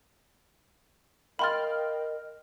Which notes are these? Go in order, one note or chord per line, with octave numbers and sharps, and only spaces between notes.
A#4 D#5 F5 G5 B5 C6 F6 A6